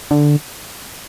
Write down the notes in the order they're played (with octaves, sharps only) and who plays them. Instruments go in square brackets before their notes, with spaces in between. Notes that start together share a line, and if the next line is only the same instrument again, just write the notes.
[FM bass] D3